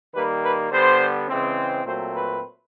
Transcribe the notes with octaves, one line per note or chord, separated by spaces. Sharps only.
D#3 G3 A#3 B4
B4
D3 G3 B3 C5
C#3 E3 G#3 C4
A#2 F#3 A3 C4 C5
B4